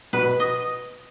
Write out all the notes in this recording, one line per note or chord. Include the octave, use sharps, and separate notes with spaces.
B2 B4
D#5